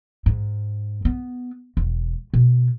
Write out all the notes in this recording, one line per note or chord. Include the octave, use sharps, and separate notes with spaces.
G#2
B3
E1
B2